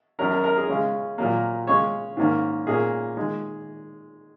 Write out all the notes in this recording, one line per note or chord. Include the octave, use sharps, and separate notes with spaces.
F#2 F#3 C#4 A#4
A#4
A#4
G#4
C#3 G#3 C#4
A#2 F#3 A#3
C#3 G#3 C#4 C#5
G#2 D#3 A#3 C#4
A#2 A#3 C#4 G#4
D#3 G#3